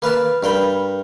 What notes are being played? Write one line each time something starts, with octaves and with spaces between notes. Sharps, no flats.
A#3 B4 F5 A5
G2 A#4 G5 B5